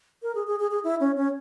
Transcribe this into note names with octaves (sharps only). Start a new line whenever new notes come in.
A#4
G#4
G#4
G#4
G#4
E4
C#4
C#4